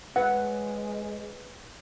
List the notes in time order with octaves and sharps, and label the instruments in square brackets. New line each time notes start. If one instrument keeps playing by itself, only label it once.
[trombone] G#3 [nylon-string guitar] B4 C#5 [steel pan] F#5